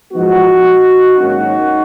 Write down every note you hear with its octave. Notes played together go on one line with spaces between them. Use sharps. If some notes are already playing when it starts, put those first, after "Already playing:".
G#2 F3 G#3 B3 D#4 F#4
G#2 D#3 F#3 A#3 C#4 D#4 F#4